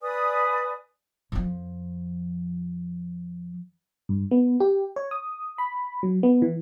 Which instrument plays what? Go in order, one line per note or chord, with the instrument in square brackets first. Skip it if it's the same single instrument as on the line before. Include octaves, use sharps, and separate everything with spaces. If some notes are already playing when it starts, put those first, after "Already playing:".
[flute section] B4 D5 G#5 D#6
[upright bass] F2 F3
[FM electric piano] G2
B3
G4
C#5
D#6
B5
F#3
B3
E3